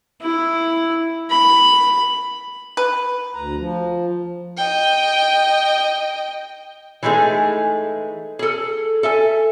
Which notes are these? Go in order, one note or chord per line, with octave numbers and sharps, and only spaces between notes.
E4
B5
B4
D2 A#5
F3
D#5 G5
E3 G#3 A3 D#4 G#4
G#4 A4
A4 E5 G#5